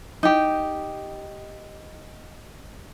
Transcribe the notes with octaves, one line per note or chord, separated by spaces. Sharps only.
D#4 G4